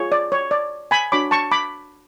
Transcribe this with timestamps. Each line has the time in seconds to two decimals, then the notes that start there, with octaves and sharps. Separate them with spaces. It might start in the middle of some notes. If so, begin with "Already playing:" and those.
Already playing: F4 G#4 C#5
0.12 D5
0.32 C#5
0.51 D5
0.91 G#5 B5
1.12 D4 F#4 C#5 B5 D6
1.31 A5 C#6
1.52 B5 D6